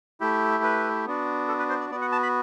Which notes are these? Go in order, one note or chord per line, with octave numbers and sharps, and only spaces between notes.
A3 E4 G4
B4
B3 D4 F#4
A4
B4
C5
D5
B3 F#4 D5
F#5
A5
B5